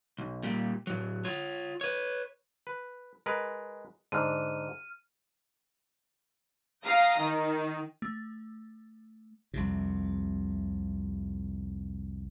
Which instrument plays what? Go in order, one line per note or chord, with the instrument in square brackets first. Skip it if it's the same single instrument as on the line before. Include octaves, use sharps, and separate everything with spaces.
[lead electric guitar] B1
A#2 G3
A2 F#3
F4 C#5
B4 C#5
[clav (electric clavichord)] B4
G#3 A#4 B4
[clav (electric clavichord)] G#2 D3 [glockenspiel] F6 D#7
[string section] F5 G5 A#5 D#6
D#3
[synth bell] A3
[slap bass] C2 F2 C3